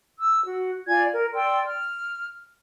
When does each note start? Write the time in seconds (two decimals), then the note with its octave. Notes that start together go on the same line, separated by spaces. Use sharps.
0.20 E6
0.46 F#4
0.87 F4 D5 G#5 G#6
1.14 A#4
1.34 D5 G5 C6 E6
1.66 F6